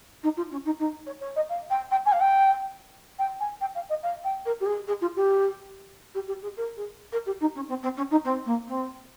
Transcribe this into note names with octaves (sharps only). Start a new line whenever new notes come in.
D#4
F4
C#4
D#4
D#4
C#5
C#5
D#5
F5
G5
G5
G#5
F5
G5
G5
G#5
G5
F5
D#5
F5
G5
A#4
G4
G#4
G#4
F4
G4
G4
G4
G#4
A#4
G#4
A#4
G4
D#4
C#4
C4
C4
C#4
D#4
C4
A#3
C4